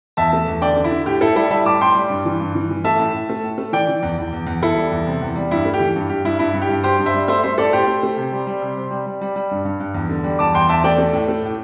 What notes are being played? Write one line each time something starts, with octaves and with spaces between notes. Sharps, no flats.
E2 E5 A5
A3
E2
D3 D5 G5
D3
E4
D3
A2 G4
A2 E4 A4
G3 E4 A4
G3 E5 A5
A2 A5 D6
A2 G5 C6
G3
G2
E3
G2
E3
E3
A3 E5 A5
A2
A2
A3
A2
A3
E3 D5 G5
E3
E2
E2
E2
E2
E2 E4 A4
G3
E2
C3
E2
G3
G2 E4
A3
G4
E3
G2
G2 G4
G2 E4
G2 E4
G2
G4
G2
G2 G4 C5
G2
C5 E5
G3
A3 C5 E5
A3 C5 E5
A2 A4 D5
A2 G4 C5
A3
A3
C3
G3
G3
C3
C3
G3
G3
G3
G3
G2
G2
G2
E2
D3
G3
E2 A5 D6
E2 G5 C6
E2 E5 A5
A3 D5 G5
A3
A2
A3
A2